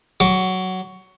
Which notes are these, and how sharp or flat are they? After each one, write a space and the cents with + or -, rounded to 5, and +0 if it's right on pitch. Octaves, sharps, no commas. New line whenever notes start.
F#3 +10 D6 -15